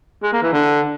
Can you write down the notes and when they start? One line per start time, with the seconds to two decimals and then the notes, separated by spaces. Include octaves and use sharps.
0.23 G#3
0.33 A#3
0.43 E3
0.53 D3